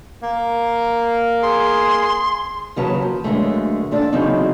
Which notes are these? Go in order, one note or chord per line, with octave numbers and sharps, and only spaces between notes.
A#3
G#4 C6
D#2 C#3 F#3 B4 A5
F3
F#2 A#2 D3 G#3 A3
F2 A#2 D4 A4 D5 A5
C#3 E3 F#3 B3 C4 D#4